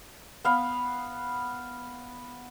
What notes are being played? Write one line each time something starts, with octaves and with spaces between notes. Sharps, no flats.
B3 F5 B5